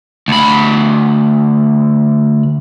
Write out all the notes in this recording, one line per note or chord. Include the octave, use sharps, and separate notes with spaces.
D2 B5